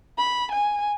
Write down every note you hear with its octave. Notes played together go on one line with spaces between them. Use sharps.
B5
G#5